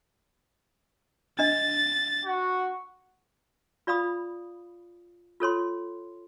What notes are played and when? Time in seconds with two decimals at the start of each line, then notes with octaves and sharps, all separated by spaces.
1.39 D4 D#5 A6
2.25 F#4
3.87 F4 D5 F5 B5 D#6
5.40 F4 A4 C#5 C6